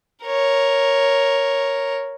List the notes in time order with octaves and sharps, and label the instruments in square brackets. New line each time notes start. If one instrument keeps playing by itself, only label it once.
[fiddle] A#4 C#5